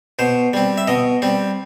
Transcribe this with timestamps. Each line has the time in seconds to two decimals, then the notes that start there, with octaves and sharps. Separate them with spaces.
0.19 B2 C5
0.53 G3 C4
0.78 E5
0.88 B2 D#5
1.22 G3 C4